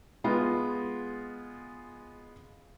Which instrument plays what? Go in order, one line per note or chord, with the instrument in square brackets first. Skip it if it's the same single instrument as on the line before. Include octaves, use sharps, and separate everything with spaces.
[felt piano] G#3 B3 F4